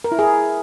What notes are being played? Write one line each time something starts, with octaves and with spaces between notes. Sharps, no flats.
A#4
E4
G#4